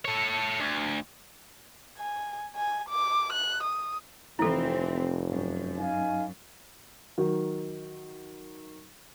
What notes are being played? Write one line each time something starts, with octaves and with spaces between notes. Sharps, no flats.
A4 C#5
D2
G#5
G#5
D6
F#6
D#6
F1 E3 C4 E4 A4
F#2
D#4 F5 G#5
D#3 F#3